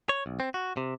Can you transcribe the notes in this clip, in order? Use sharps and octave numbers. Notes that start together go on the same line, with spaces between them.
C#5
B1
C4
F#4
C3